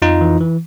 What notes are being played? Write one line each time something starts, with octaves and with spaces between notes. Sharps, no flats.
F2 D#4 F4
E3
E3